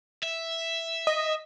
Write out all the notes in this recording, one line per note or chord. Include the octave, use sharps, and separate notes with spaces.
E5
D#5